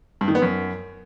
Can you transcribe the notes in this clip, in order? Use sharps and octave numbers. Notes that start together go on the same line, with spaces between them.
G2
D#3
B3
F#2